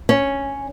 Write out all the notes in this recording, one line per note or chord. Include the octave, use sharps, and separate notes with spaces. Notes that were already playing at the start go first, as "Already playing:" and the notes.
C#4